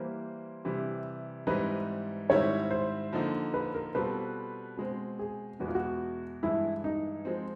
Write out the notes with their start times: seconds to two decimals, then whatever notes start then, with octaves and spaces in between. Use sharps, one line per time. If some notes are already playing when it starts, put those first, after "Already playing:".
Already playing: E3 G3 A#3 C5
0.65 C3 E3 G3
1.47 G#2 E3 G3 C4 D#4 B4
2.29 G#2 D#3 G3 C4 E4 C#5
2.71 C5
3.13 D3 F3 A#3 D#4
3.54 B4
3.74 A#4
3.94 B2 G3 C4 F4 A4 B4
4.77 B2 G#3 C4
5.19 G#4
5.60 E2 B2 G#3 B3 F#4
5.68 F4
5.75 F#4
6.43 G2 E3 G#3 E4
6.84 D#4
7.25 F3 G#3 C4